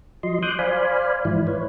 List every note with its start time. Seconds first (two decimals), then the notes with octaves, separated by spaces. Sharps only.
0.23 F3 F#3 D#5 C6
0.42 C6 D6 D#6 F#6 G6
0.59 C5 D5 F5 G#5 B5
1.25 G#2 E3 F3 E4
1.47 B4 C#5